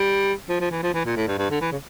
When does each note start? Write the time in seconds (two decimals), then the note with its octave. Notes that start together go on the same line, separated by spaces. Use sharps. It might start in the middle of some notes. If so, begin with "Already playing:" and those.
Already playing: G3
0.49 F3
0.60 F3
0.71 E3
0.83 F3
0.94 E3
1.06 A#2
1.16 A2
1.27 G2
1.38 G2
1.50 D3
1.61 E3
1.72 C#3